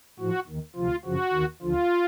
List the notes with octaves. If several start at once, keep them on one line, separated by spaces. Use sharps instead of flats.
A2 F3 F#4
D#2 D#3
D2 C3 F3 F4
F#2 C#3 F3 F#4
D#2 D#3
D2 D3 F3 F4